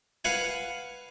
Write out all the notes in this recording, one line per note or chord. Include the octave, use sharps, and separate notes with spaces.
B4 F5 F#5 G#5